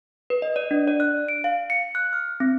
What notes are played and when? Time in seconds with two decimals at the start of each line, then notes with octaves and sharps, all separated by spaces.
0.30 B4
0.42 D#5
0.56 D5
0.71 D4
0.88 D5
1.00 F#6
1.29 D7
1.44 F5
1.70 C#7
1.95 F#6
2.13 F6
2.40 C4